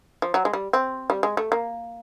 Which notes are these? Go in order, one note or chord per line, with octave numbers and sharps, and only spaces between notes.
F3
F#3
G#3
G3
C4
G3
G#3
A3
A#3